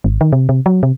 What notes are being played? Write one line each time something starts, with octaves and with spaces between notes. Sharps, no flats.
G#1
D#3
C3
C3
F#3
C3